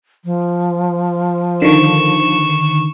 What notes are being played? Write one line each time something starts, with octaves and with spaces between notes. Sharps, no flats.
F3
D3 D#3 C#6 E7